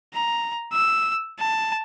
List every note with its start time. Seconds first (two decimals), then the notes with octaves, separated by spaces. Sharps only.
0.14 A#5
0.73 E6
1.39 A5